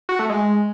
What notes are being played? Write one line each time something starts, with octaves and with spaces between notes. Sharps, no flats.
F#4
A3
G#3